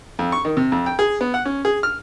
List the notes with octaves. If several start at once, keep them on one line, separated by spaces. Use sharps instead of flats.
F2
C#6
D#3
C3
F2
G5
G#4
B3
F#5
C#4
G#4
F6